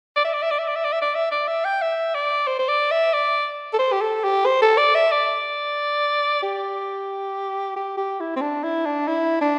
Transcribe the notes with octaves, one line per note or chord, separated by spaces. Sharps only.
D5
E5
D5
E5
D5
E5
D5
E5
D5
E5
D5
E5
D5
E5
G5
E5
D5
C5
C5
D5
E5
D5
A4
C5
G4
A4
G4
C5
A4
D5
E5
D5
G4
G4
G4
E4
C4
D4
E4
D4
E4
D4